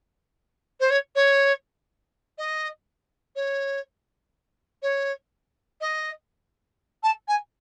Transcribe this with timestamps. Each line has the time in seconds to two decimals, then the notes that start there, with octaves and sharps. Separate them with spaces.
0.80 C5
0.90 C#5
1.15 C#5
2.38 D#5
3.36 C#5
4.82 C#5
5.81 D#5
7.03 A5
7.28 G#5